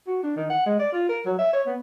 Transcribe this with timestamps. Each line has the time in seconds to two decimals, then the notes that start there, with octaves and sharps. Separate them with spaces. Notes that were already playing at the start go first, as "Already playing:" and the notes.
0.07 F#4
0.23 D4
0.36 D#3
0.50 F#5
0.66 G#3
0.79 D5
0.92 F4
1.09 A#4
1.26 F#3
1.39 E5
1.53 C#5
1.66 B3